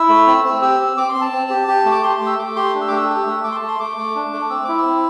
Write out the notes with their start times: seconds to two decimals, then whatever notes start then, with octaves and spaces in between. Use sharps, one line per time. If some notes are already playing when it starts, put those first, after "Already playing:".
Already playing: E4 E6
0.09 A3
0.27 C4
0.44 C4
0.62 G4 E6
0.80 C4
0.97 C4 D6
1.09 C6
1.15 C4
1.21 A5
1.33 C4
1.50 G4
1.68 G4
1.85 A3
1.92 D6
2.03 G4 C6
2.09 A5
2.15 C6
2.22 A3
2.27 E6
2.39 A3 D6
2.56 G4 C6
2.74 D4
2.81 E6
2.88 D6
2.91 A3
2.96 E6
3.09 G4
3.27 A3
3.44 A3 D6
3.52 C6
3.56 A5
3.62 A3
3.68 C6
3.80 A3 D6
3.97 A3
4.15 D4
4.33 A3
4.50 C4 E6
4.64 E4 D6
4.78 E6
4.86 C4